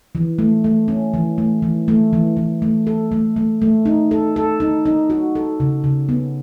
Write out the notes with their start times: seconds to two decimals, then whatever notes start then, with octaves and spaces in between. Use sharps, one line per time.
0.15 E3
0.39 A3
0.64 A3
0.88 C#4
1.14 E3
1.38 A3
1.62 E3
1.88 A3
2.13 E3
2.37 E3
2.62 A3
2.87 A4
3.12 A3
3.36 A3
3.62 A3
3.85 D#4
4.11 A4
4.36 A4
4.60 D#4
4.86 D#4
5.10 F#4
5.35 A4
5.60 C#3
5.84 C#3
6.09 B3